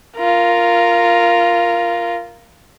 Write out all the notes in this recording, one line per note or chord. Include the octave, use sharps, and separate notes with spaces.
F4 A#4